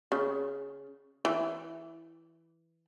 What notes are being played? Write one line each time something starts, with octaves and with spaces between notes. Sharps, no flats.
C#3
E3